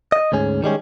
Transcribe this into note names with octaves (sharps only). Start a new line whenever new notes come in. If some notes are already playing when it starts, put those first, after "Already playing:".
D#5
D2 G#2 C#4 G#4
D#3 G3 G#3 C#4